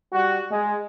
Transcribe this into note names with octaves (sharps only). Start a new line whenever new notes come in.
G3 F#4
G#3